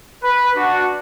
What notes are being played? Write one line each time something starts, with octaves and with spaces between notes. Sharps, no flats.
B4
D4 F#4